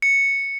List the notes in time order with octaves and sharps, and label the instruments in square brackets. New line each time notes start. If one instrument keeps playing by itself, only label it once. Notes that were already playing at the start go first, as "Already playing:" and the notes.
[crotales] C#7